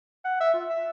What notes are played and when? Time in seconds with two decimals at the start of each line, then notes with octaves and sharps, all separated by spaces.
0.25 F#5
0.41 E5
0.54 F4
0.69 E5